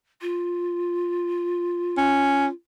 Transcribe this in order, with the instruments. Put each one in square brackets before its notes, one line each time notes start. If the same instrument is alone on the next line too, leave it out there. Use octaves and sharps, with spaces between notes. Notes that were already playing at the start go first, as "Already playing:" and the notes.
[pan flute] F4
[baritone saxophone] C#4